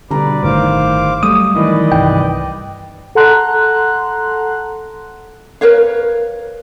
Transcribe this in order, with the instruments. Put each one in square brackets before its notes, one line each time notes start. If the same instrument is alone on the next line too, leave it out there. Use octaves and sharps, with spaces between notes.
[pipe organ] B2 B4 D5 [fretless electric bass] D3 [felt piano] G3 A#5
[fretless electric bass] G1 A2 D#3 [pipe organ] C5 F5 D6
[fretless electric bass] F#3 G3 A3 [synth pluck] D#6
[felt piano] D#3 E3 [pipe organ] B4 D5 D#5
[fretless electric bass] C2 G2 [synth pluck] G5
[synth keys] A4 F#5 A5 A#5 C6 F#6
[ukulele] A#4 B4 C#5 F5